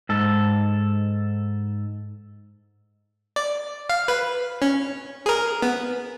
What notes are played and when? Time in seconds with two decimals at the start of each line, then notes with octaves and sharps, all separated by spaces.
0.09 G#2 A4
3.36 D5
3.90 F5
4.08 B4
4.62 C#4
5.26 G#4 A#4
5.62 B3